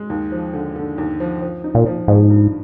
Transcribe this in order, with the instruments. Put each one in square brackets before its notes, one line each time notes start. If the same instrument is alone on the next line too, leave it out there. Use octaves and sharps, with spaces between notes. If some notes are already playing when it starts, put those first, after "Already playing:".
Already playing: [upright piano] G#3
D#2
F3
D3
D3
D#2
F3
F3
D#4
[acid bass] A#2
[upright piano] F3
[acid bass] G#2 [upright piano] F3
[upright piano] G2